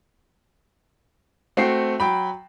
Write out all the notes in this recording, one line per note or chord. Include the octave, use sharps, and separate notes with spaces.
A3 C4 F#4 G5 C7
F#3 G5 B5